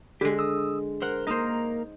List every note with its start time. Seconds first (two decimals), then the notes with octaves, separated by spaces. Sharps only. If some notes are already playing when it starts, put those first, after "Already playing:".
0.21 D3 G#3 G4
0.39 D#6 E6
1.02 A#4 C5 F#5
1.27 A#3 D#4 A#4 C5 D#5